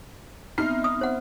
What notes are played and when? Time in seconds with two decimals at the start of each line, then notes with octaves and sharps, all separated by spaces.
0.58 B3 C4 D#4 E5 F6 C7
0.84 D#6
1.01 C5 F#5